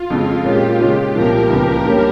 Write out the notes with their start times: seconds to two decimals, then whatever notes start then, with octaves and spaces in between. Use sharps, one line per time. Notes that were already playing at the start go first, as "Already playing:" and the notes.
Already playing: F4
0.10 F2 C#3 G#3
0.45 A#2 G#3 C#4 G4
0.80 C#3 G#3 C#4
1.15 C2 A#2 F3 A#4
1.50 C#2 C#3 F3 A#3
1.85 G2 G3 A#3 C#4